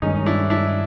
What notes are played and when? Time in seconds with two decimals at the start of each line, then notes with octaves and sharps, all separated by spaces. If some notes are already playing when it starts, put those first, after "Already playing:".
0.02 G2 D#3 G#3 C#4 D#4
0.26 D4 E4
0.50 D4 E4